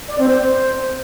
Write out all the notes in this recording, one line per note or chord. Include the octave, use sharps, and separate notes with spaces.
D5
C4
C5